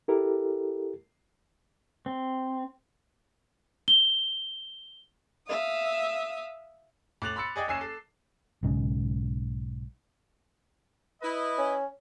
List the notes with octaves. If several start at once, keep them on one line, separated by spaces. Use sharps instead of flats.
E4 G4 A4 A#4
C4
G7
E5 F5 D#6
A2 D6 F#6 A6 F7 F#7
B5 C6 E6 A6 C#7
G#4 D5 D#5 G5
F#1 C#4 G#5 E6 C7 E7
A4
B1 G#2 C#3
E4 B4 D#5
C#4